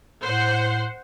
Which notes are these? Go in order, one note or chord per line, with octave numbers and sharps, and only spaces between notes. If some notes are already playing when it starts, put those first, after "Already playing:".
A2 C5 F#5